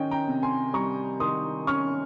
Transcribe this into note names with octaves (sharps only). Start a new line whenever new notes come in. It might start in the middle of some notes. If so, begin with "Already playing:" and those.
Already playing: D#3 C#4 D#5 G5
G5 A#5
C3
G#5 C6
G3 A#5 C#6
D#3 C6 D#6
C#4 C#6 F6